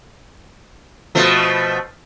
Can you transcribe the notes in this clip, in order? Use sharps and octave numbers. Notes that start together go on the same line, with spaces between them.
B2 F3 A3